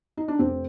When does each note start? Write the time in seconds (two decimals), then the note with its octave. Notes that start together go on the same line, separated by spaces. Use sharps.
0.17 D#4
0.28 D4
0.39 F1 C4